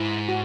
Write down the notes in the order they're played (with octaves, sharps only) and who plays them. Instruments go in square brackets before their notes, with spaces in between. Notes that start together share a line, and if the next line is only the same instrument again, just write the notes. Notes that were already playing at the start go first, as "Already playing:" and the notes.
Already playing: [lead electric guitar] G#2 [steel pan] E4
[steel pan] F#4